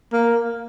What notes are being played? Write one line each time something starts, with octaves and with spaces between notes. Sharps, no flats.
A#3